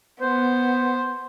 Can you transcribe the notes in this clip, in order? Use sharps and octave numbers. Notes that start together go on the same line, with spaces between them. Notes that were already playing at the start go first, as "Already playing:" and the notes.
B3 C5